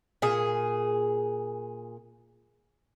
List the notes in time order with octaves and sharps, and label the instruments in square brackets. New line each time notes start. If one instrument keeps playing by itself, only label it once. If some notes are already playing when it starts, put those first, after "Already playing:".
[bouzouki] A#2 G#4